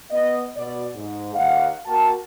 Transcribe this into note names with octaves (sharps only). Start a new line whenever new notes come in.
B3 D#5
B2 D5
G#2
D#2 F5 F#5
A#3 F#4 A#4 G5 A5